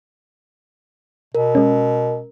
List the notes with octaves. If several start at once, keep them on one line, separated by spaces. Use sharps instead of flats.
B2 A#4
G#3 C#4